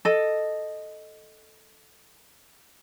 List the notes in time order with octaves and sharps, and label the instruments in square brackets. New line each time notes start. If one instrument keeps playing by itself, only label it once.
[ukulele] A4 D#5